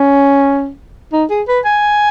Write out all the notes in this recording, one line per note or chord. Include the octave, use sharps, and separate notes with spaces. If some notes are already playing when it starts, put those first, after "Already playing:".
Already playing: C#4
D#4
G#4
B4
G#5